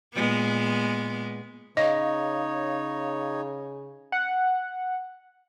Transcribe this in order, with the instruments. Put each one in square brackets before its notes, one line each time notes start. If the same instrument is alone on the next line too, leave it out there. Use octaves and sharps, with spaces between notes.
[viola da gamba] A#2 G#3 B3
[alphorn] C#3 [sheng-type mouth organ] D#4 C#5 [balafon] D#5 [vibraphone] F5
[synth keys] F#5